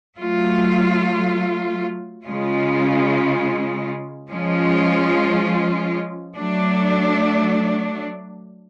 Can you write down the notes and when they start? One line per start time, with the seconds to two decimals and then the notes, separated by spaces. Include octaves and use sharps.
0.17 F#3 A3 F4
2.23 C#3 G#3 C#4 F4
4.30 F3 G#3 C#4 F4
6.37 F#3 A3 D4